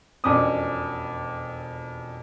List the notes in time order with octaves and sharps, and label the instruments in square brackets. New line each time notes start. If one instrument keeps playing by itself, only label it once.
[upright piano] E1 F2 C#4 D4 D6 D#6